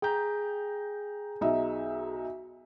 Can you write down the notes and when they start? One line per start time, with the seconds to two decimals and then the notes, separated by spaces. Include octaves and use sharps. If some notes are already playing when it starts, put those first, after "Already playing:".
0.02 G#4 G5 A#5 G6
1.41 B1 D#4 E5